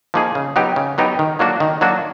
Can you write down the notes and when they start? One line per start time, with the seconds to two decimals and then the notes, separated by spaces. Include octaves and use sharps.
0.14 F3 A#3 D#4 G#4
0.35 C#3
0.56 F#3 B3 D#4 G4
0.76 C#3
0.98 F#3 B3 D#4 G4
1.19 D#3
1.39 F#3 A#3 D4 F#4
1.60 D#3
1.81 F#3 A#3 D4 F#4